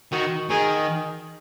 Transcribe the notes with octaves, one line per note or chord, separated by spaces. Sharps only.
D#3 F#4
D#3 G#4